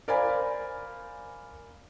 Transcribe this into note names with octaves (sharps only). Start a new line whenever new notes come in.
A#4 C5 D5 F5 G#5 B5